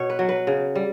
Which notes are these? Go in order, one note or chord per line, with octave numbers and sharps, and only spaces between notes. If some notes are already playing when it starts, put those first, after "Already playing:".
Already playing: B2 C#5
B4
F#3
B4
C#3
G3